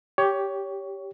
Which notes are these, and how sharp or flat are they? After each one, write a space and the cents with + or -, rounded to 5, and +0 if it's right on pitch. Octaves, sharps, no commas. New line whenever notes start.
G4 +0 C#5 +15